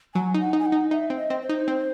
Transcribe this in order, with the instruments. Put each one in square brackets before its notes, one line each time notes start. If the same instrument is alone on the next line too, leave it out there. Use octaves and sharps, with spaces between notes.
[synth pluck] F#3 [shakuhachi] G#5
[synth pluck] D#4
[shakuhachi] F#5
[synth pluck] D#4
[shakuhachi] G#5
F#5
[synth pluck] D#4
[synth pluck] D#4 [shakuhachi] E5
[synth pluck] C4
[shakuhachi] D#5
[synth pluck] C4
[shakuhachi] C5
[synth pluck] D#4
C4